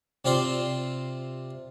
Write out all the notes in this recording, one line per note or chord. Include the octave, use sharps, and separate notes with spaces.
C3 C4 F4 D5 C6